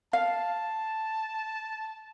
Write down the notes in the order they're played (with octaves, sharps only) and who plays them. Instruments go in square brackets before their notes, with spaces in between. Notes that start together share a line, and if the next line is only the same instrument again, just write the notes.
[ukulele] F5 [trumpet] A5